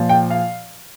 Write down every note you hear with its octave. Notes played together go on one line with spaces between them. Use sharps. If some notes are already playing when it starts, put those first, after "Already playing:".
Already playing: A#2 F3
G5
F5